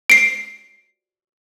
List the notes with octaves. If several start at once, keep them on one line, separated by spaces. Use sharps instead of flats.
C7 D7